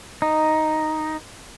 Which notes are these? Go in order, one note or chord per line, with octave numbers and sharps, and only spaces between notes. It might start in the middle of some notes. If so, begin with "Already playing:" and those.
D#4